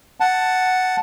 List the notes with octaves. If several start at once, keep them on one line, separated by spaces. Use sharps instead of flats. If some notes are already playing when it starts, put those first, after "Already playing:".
F#5 A5